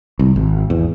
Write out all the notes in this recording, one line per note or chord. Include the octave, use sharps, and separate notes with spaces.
C2
G#1
E2